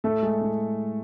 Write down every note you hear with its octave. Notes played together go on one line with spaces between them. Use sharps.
A2 A3 A4
G#3
A2